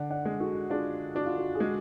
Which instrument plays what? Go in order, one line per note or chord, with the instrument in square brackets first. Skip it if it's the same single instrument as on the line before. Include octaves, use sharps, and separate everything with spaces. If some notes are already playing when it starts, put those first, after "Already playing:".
Already playing: [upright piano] D3 [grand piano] D5 F#5
[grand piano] D5 F#5
[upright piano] G#3
[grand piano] F#4 A4
[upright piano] D4 [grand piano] F4 G#4
[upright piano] D4 [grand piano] F#4
[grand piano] F4
F#4
G#4
[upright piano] G#3 [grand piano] F#4